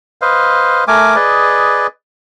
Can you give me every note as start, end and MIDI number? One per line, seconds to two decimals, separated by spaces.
0.22 0.84 71
0.22 0.84 72
0.22 0.84 75
0.22 0.84 77
0.88 1.16 57
0.88 1.16 70
0.88 1.16 80
0.88 1.16 86
1.16 1.87 68
1.16 1.87 71
1.16 1.87 74
1.16 1.87 75